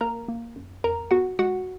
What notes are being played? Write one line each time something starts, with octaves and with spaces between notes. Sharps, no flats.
A#3 A#4 A#5
A#3
F#2
F2 A#4 A#5
B3 F#4 F#5
G#3 F#4 F#5